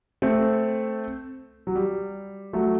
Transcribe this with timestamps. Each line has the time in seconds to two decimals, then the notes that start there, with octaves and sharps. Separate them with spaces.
0.22 A3 C4
1.67 F#3
1.75 G3
2.53 F#3 A3